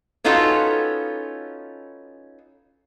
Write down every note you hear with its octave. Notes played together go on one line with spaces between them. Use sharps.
B3 C#4 D#4 F4 F#4 A4